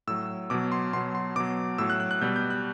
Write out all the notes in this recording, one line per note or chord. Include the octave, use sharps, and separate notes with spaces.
A2 F#3 E6
B2 F#3 D6
C6
B2 F#3 C6
C6
B2 F#3 D6
A2 F#3 E6
F#6
F#6
F#6
B2 G3 G6
G6
F#6